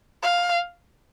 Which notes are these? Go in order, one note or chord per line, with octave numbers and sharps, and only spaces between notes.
F5